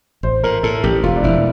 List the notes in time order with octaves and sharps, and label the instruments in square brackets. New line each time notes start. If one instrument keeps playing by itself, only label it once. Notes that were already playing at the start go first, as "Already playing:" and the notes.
[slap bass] A1 [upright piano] C5
[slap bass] A2 [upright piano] A#4
[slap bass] A2 [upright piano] A4
[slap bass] A1 [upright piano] G4
[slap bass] E1 [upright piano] F4
[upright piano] D4
[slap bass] E1 [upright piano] E4